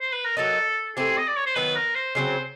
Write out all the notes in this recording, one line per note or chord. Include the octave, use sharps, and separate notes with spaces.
C5
B4
A#4
F#3 A#3 D#4 A4
A3 C4 E4 G4 G#4
D#5
D5
C#5
C5
D#3 F#3 B3 B4
A#4
C5
C#3 F#3 A3 C4 C5